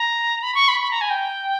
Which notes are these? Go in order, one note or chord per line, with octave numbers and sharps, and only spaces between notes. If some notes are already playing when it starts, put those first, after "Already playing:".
Already playing: A#5
B5
C#6
B5
B5
A#5
G#5
G5